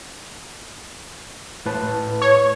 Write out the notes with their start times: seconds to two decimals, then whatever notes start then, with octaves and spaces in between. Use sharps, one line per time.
1.66 A2 B4 A5
2.21 C#5